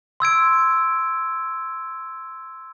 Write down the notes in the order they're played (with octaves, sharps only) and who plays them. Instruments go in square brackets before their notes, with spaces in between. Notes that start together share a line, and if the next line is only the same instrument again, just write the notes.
[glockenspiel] C6 E6 G#6 D7